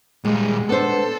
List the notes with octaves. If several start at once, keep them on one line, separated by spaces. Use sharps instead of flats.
A#2 G3 G#3
B3 D4 A4 C5